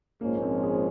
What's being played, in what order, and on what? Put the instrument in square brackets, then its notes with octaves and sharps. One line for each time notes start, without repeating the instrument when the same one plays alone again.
[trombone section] A#1 G#2 F3 G#3 C#4 [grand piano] A#3
[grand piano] A#3
C4
G#4